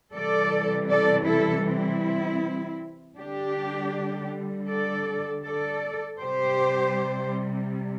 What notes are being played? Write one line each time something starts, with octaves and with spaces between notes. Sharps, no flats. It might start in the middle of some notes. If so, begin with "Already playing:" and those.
C3 E3 G3 A4 D5
A4 D5
E4 A4
C4 E4
D3 G3 D4 G4
A4 D5
A4 D5
C3 G3 G4 C5